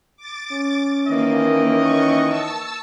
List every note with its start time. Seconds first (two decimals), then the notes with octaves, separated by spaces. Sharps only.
0.17 D6 A6
0.52 C#4
1.07 D#3 E3 A#3 D#5
1.79 C#6
2.26 A5 E6